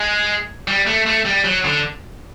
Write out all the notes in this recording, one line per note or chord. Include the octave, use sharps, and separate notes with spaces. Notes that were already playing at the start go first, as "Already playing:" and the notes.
Already playing: G#3
G3
A3
A3
G3
F#3
D3